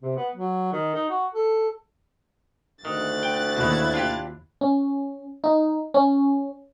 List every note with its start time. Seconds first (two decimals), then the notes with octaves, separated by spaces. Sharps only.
0.02 C3
0.16 B3
0.35 F#3
0.72 D#3
0.94 D#4
1.09 F#4
1.34 A4
2.85 D2 D#3 F#6 A6
3.23 G5
3.56 D#2 B2 D#3 E4 G#6
3.94 D4 F4 G4
4.61 C#4
5.44 D#4
5.94 C#4